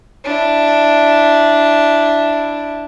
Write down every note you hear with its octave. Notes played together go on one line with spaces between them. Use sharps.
D4 E4